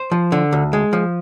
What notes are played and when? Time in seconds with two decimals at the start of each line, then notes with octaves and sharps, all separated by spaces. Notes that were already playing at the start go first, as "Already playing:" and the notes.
Already playing: C5
0.11 F3
0.32 D3
0.52 D2
0.73 G#3
0.93 F3